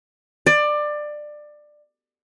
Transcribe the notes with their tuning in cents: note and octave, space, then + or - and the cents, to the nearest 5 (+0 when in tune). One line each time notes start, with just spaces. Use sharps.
D5 +20